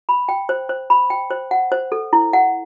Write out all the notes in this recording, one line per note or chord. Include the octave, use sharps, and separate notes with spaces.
B5
G5
C5
C5
B5
G5
C5
F#5
C5
A4
E4
F#5